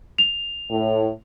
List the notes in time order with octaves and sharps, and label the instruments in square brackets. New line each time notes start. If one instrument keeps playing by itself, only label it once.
[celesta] F7
[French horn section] A2